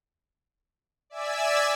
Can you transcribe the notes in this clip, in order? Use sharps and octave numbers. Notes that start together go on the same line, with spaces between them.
D5 E5 G#5 E6